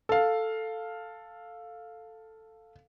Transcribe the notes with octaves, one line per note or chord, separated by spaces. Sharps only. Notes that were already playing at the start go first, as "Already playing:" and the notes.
A4 F5